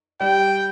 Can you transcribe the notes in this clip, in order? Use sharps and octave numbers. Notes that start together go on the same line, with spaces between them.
G3 G5